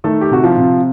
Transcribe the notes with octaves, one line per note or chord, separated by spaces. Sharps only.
D#3 A3 A4
G4
C3 F#4
F3 F4
C3